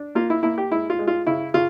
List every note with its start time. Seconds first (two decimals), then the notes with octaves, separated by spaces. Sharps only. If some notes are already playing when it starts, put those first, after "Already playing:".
Already playing: D4
0.15 A#3 F4
0.30 E4
0.43 A#3 E4
0.58 G4
0.71 G#3 E4
0.90 F4
0.99 G#3
1.08 F4
1.27 C#3 E4
1.54 C#3 F4